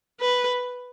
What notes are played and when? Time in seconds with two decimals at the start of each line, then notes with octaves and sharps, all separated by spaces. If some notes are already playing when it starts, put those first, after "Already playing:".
0.21 B4